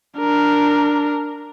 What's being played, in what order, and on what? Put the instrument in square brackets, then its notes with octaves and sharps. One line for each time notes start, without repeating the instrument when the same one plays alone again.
[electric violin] D4 A#4